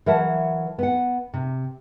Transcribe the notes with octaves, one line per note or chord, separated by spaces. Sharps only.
E3 F#3 A#4 E5 F#5 A5
B3 F#5
C3